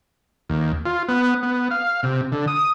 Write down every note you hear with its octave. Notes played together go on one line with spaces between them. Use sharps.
D#2
F4
B3
B3
F5
C3
D3
D#6